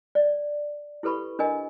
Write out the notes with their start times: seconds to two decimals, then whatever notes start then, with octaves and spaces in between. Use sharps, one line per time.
0.15 D5
1.03 E4 G4 A4 B4 B5 C#6
1.39 D4 A#4 D#5 G#5